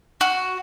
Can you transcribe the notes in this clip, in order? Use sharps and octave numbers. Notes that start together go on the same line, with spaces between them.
F#4